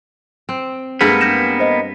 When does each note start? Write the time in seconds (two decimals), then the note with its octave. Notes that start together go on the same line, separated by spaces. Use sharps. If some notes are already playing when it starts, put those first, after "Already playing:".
0.49 C4
1.01 G2 G3 G#3 A#3 B3 A4
1.21 G6 A#6 E7
1.60 C5 D#5